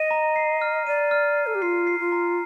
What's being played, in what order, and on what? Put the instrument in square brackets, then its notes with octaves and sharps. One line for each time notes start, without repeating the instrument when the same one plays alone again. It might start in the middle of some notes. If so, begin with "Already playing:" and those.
Already playing: [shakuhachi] D#5 [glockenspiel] D#7
[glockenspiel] A#5
C7
F6
[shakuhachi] D5 [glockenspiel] D#7
[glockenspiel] F6
C7
[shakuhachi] A4
G4
[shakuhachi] F4 [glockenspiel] C7
[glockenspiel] C7
[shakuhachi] F4
[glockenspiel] A#5